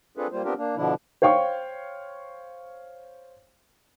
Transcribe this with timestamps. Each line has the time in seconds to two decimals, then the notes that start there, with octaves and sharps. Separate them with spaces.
0.17 C4 D4 F4 G#4 A4 B4
0.32 G3 A#3 F4 C5
0.44 B3 C4 D4 F4 G4 A#4
0.57 A#3 D4
0.77 B2 D3 F3 D4 E4
1.22 C5 C#5 F5 G5 C#6